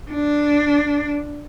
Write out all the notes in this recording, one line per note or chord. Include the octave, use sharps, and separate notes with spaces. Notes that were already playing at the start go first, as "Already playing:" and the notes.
D4